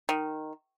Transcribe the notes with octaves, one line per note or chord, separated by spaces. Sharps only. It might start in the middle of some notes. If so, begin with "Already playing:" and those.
D#3